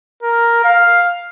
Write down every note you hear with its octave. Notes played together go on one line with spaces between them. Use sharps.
A#4
F5